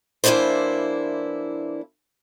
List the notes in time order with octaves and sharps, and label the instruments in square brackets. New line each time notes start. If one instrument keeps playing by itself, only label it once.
[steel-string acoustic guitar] E3 A#3 C4 D4 E4 C5